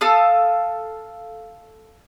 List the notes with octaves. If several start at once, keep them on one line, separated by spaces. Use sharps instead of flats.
A4 F5 A5 D#6